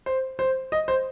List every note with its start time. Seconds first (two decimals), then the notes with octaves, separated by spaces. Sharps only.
0.06 C5
0.39 C5
0.72 D#5
0.88 C5